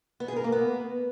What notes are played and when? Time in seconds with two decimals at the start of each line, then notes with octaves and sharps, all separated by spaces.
0.20 B3
0.28 G#4
0.36 A#4
0.44 A#3
0.52 B3